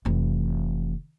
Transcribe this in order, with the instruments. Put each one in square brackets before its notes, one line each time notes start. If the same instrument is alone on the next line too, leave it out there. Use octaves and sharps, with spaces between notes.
[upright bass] F1 E3